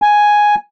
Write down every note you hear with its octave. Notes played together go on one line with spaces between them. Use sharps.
G#5